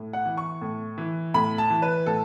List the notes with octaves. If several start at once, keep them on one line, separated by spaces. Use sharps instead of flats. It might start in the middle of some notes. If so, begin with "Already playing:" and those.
Already playing: A2
F#5
E3
C#6
A2
E3
A2 B5
A5
E3
B4
A2 A4